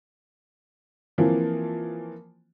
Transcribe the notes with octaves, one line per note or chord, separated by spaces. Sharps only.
E3 F3 A#3 C4